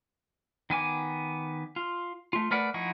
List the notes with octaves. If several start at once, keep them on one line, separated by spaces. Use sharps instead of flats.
D#3 B3 G#5 D6
F4
A3 F4
A3 A#4 B4 D5 F#5
F3 D#4 E4 F#5 C#6